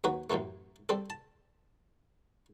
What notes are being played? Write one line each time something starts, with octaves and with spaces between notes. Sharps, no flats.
D#2 F#3 F#4 B4
A1 F#2 A2 E3 A3
G3 C4 A4
A5